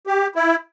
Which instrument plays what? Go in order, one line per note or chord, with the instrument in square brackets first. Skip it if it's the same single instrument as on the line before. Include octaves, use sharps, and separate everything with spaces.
[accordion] G4
E4